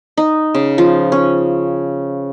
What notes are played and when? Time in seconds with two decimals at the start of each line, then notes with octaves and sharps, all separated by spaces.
0.18 D#4
0.55 C#3
0.78 F3
1.12 C#4